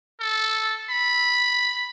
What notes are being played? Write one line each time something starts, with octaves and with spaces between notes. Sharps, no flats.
A4
B5